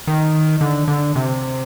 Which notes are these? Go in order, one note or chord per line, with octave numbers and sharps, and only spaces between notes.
D#3
D3
D3
C3